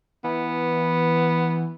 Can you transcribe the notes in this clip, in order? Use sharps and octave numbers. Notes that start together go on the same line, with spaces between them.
E3 B3